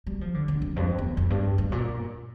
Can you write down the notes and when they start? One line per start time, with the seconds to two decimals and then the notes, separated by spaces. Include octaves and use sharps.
0.07 G3
0.21 F3
0.34 D3
0.48 D3
0.62 F2
0.76 G2
0.79 F2
0.98 E2
1.17 F2
1.30 G2
1.58 G2
1.72 A#2